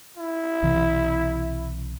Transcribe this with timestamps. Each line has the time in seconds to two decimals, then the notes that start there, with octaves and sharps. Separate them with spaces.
0.17 E4
0.62 B1 C3 E3